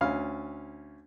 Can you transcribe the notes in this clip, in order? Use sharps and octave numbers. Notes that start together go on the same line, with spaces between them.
D2 C#4 F5